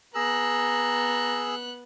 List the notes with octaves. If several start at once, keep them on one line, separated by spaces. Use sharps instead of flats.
B3 G#4 A#5 E6 F#6